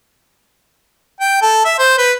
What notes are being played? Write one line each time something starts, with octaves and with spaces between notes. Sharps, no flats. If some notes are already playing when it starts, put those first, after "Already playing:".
G5
A4
E5
C5
B4